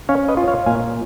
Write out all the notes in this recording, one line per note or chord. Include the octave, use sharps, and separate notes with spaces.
C#4 C#5 F5
B4 D#5
F4
C#5 F5
A#2 F5 G#5